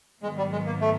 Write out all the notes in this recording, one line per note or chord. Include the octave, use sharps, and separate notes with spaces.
G#2 D#3 F#3 G#3 B3
G3
G#3
A#3
A3